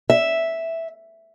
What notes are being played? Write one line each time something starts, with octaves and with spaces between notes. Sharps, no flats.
E5